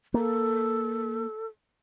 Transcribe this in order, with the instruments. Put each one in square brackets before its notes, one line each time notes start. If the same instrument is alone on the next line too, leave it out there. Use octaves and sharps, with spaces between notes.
[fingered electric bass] A#3 [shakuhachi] A4